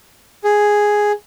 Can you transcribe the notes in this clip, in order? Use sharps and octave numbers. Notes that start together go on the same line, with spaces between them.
G#4